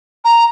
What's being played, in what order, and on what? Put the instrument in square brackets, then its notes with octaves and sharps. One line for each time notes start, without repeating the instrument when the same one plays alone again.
[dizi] A#5